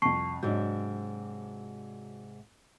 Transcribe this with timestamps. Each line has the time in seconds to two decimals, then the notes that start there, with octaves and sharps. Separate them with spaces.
0.02 C2 F2 A5 C#6 C7
0.43 G#2 C3 F#3 D4 G6